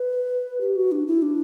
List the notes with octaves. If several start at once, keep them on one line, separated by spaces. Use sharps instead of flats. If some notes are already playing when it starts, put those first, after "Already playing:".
Already playing: B4
G4
F#4
D4
E4
D4